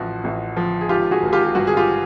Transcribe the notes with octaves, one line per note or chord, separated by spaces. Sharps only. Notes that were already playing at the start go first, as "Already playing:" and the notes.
Already playing: A1 F3 F#4
A1
F3
G#4
G#1 F4 G4
F#4 G#4
G#1
F4 G4
G4
G2 F#4
G#4
F4 G4